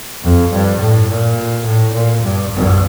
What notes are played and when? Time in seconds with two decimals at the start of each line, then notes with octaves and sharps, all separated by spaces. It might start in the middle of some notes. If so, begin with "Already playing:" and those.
0.23 F2
0.51 G2
0.79 A2
1.09 A#2
1.64 A2
1.93 A#2
2.21 G2
2.50 G2